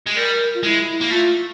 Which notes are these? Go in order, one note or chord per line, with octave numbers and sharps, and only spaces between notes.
G#3
G3 A#4
F4
G#3 E4
A#3
A3 F4